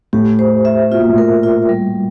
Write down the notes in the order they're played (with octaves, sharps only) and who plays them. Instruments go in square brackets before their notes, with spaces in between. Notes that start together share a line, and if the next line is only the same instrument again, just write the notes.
[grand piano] A2 [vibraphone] G4
[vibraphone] C5
E5
[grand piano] B2 [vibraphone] F4
[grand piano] A#2
A2
[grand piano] A#2 [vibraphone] A#4
[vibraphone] F4
G3